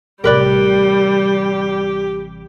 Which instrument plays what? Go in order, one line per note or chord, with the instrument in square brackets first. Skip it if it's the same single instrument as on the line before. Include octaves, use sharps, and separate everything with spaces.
[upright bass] A1 C3 [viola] G3 [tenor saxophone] G4 [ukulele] A#4 B4 D5